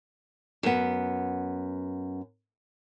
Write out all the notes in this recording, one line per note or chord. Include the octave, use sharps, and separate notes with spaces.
F#2 B3